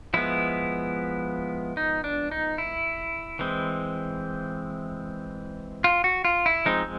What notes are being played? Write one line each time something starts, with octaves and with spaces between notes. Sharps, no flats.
F3 G#3 B3 E4
D#4
D4
D#4
E4
E3 G#3 C4
F4
F#4
F4
E4
F3 G#3 C4 D#4